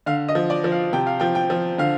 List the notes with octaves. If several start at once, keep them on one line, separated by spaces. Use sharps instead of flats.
D3 F5
D#5
F3
D5
F3
F5
C3 G5
F5
F3 G5
G5
F3
D3 F5